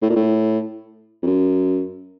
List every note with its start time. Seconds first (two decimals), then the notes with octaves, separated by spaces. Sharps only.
0.02 A2
0.10 A#2
0.16 A2
1.23 F2
1.27 F#2